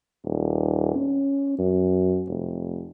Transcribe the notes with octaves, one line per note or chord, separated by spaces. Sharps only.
D#1
C#4
F#2
F1